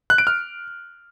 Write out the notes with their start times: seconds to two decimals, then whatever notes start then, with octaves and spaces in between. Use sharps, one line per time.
0.10 F#6
0.18 D7
0.27 F6